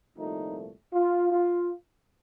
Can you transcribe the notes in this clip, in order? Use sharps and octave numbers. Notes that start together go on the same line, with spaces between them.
C2 A#2 F3 A3 D#4
F4
F4